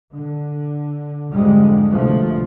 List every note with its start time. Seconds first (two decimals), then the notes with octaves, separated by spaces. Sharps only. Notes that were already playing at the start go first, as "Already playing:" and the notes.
0.13 D3
1.31 F2 G#2 D3 G3 G#3
1.91 C2 B2 D3 F3 A3